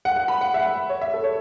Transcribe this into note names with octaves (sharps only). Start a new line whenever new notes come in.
F#5
F#5
B5
F#5
E5
F#5
C#5
E5
A4
C#5